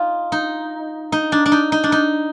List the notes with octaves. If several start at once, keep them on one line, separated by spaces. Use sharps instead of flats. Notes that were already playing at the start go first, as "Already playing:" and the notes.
Already playing: D#4 F4
D#4
D#4
D4
D4
D#4
D#4
D4
D#4